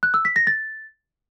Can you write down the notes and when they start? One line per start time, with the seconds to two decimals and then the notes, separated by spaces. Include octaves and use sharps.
0.03 F#6
0.14 E6
0.25 B6
0.36 A#6
0.47 A6